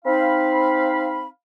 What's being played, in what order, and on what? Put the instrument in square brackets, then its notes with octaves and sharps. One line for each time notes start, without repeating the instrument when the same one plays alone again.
[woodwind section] C4 D#4 F5 B5